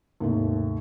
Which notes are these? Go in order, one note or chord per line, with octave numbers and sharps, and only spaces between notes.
D#2 G#2 C3 A3